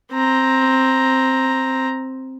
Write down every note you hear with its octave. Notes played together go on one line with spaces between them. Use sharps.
C4 A#5